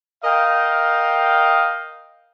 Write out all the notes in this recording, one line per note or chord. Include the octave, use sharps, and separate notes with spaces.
A#4 D#5 F5 G5